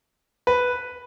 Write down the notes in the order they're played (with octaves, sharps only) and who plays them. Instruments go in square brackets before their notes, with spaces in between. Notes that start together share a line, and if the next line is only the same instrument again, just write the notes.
[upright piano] B4